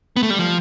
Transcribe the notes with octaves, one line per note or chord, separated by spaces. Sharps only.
B3
A3
G3
F3